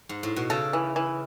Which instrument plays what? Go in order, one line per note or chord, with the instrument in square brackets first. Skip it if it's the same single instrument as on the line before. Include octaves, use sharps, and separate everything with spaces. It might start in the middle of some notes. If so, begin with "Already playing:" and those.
[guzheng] G#2
A2
B2
[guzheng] C#3 [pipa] A4
[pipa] E3
E3